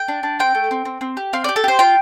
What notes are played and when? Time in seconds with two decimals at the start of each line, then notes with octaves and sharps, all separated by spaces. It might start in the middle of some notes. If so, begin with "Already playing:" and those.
Already playing: G5
0.08 D4
0.23 D4
0.39 C4 G5
0.55 A3
0.71 C4
0.85 C4
1.01 C4
1.17 G4
1.33 C4 F5
1.44 G4 D5
1.56 A4
1.64 G4 C5
1.79 F4 G5